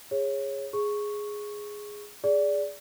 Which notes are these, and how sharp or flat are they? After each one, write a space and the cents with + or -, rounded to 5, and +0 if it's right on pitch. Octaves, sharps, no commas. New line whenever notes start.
G#4 -15 C#5 -15
G#4 +0 C#6 +0
G#4 -5 D5 -15